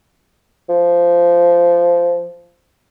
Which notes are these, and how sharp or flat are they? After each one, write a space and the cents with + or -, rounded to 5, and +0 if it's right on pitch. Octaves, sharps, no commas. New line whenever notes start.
F3 -15